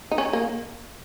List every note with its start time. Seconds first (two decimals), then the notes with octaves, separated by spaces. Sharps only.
0.11 D#4
0.18 C#4
0.33 A#3